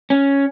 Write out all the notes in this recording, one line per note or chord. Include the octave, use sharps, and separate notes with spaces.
C#4